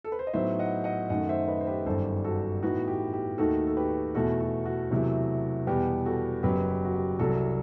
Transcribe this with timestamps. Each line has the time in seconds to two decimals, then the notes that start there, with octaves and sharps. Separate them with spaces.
0.04 A4
0.12 B4
0.19 C5
0.27 D#5
0.34 A2 F#3 B3 D#4 C5 E5
0.59 D#5 F#5
0.84 D#5 F#5
1.09 F#2 D#3 A3 D#5 F#5
1.29 C5 E5
1.48 B4 D#5
1.61 C5
1.67 G4 B4
1.86 G1 F#2 D#3 G3 A4 C5
2.24 F#4 A4
2.63 A2 E3 B3 D#4 F#4
2.88 G4
3.14 G4
3.38 D#2 D#3 A3 D#4 F#4 A4
3.67 A4
3.77 G4 B4
4.15 E2 B2 A3 E4 F#4 A4
4.41 F#4
4.66 F#4
4.91 E2 C3 F#3 A3 E4
5.67 E2 B2 G3 B3 G4
6.05 F#4 A4
6.43 F#1 F#2 F#3 B3 G4 B4
6.69 G4
6.85 F#4
6.94 G4
7.19 C2 C3 F#3 F#4 A4